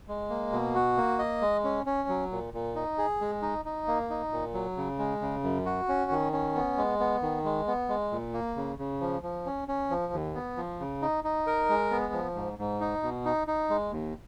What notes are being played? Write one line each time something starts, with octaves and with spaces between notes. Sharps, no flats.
G#3
A#3
B2
F#4
A#3
D#5
G#3
C#4
C#4
F#3
A#2
A#2
D#4
G#4
G#3
D#4
D#4
A#3
D#4
A#2
F#3
C#3
G#3
C#3
F#2
F#4
C#4
D#3
C#4
B3
G#3
B3
D#3
G#3
B3
G#3
A#2
A#3
C#3
C#3
F3
F3
C#4
C#4
F3
D#2
B3
F3
C#3
D#4
D#4
A#4
G#3
B3
F3
G#2
G#2
D#4
B2
D#4
D#4
G#3
D#2